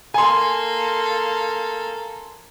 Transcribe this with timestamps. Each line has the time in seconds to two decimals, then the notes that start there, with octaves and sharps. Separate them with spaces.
0.14 A#3 A4 G#5 C6